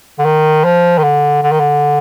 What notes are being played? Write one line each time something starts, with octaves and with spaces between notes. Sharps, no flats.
D3
D#3
F3
D#3
D3
D3
D#3
D3